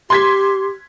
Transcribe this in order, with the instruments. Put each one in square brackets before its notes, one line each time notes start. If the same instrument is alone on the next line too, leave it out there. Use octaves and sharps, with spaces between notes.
[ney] G4 [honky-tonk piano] C6 G#6 B6